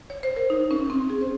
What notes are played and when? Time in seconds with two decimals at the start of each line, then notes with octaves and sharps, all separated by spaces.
0.10 C#5
0.23 C5
0.36 A#4
0.50 D#4
0.71 C#4
0.90 C4
1.10 G#4
1.21 C5